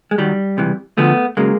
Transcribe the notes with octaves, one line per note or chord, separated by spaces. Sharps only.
G#3
F#2 D#3 F#3 G3
C#2 C3 E3
D2 D3 F3 A3 B3
C#3 F#3 G#3 A#3